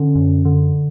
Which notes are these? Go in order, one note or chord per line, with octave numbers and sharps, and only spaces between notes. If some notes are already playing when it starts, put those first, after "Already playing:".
Already playing: D3 C#4
F#2
D3